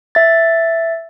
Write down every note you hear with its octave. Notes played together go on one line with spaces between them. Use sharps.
E5 A6